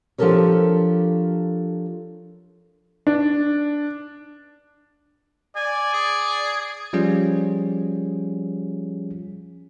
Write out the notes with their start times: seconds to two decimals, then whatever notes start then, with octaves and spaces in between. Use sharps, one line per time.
0.18 F3 D4 G4 A4 A#4 C#5
3.07 D4
5.56 D5 G#5
5.94 G#4
6.93 F3 G3 C#4 F4 G#4